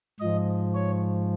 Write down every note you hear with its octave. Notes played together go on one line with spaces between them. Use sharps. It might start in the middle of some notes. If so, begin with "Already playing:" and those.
G#2 F3 D#5
C#5